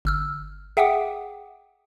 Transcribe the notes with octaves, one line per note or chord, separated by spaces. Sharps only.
G1 E6 F6
G#4 E5 F#5 G5 D6 D#6